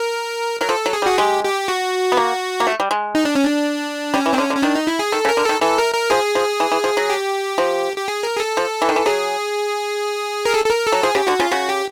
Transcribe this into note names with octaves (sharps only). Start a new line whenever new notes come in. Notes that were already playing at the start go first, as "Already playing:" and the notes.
Already playing: A#4
F#3 A#4
F3 A4
F#3
G#4
G3
F#4
G#3 G4
G4
F#4
B3
A#3
A#3
A3
G3
G#3
D#4
D4
C#4
D4
G3 C#4
E3
D#3 C4
D3 C#4
D3
C#4
D#3 D4
D#4
E4
G#4
D#3 A4
C#3
A#4
D3
D#3 A4
E3 A4
A#4
A#4
F3 G#4
F3
E3
E3
F3
F#3
G4
F3
G4
G#4
A#4
G#4
A4
F3
E3
D#3
E3
F#3 G#4
A#4
A4
A4
A#4
A4
F#3
F3 G#4
C#3 G4
D3 F#4
C#3 F4
C#3 F#4
G4